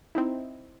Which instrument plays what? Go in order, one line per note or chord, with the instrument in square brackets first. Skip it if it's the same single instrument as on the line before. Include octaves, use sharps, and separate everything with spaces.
[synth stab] C4 D#4 E4